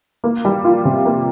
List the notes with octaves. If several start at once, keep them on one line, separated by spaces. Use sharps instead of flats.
A#3
G3
F4
C3
A#3